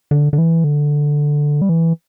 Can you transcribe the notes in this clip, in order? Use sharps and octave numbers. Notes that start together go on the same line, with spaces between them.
D3
D3
E3
D3
G3
E3